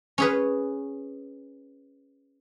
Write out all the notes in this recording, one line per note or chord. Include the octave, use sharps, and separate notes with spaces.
C#4 G#4 B4